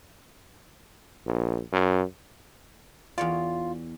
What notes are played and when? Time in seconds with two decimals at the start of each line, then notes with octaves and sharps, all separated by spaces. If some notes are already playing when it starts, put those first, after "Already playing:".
1.26 A#1
1.73 F#2
3.18 E2 F4 C#5 D5